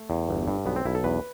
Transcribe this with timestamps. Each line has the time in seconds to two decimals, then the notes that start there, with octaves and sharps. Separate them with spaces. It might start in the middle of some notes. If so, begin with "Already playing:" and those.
Already playing: A3
0.10 E2
0.29 G1
0.48 G2
0.66 B1 B3
0.76 C4
0.85 B1 E4
0.95 A4
1.04 E2 B4